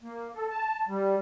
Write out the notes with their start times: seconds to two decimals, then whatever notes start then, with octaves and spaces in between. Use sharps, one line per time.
0.03 A#3
0.35 A4
0.51 A5
0.88 G3